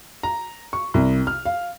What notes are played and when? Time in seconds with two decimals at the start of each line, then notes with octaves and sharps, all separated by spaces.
0.23 A#5
0.73 C#6
0.94 C2
1.27 F6
1.45 F5